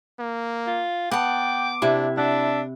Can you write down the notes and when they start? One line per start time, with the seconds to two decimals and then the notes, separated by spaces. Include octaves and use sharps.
0.20 A#3
0.67 F4
1.11 B3 F#5 G5 A5 D6
1.82 C3 D4 E4
2.17 D4 E5 F#5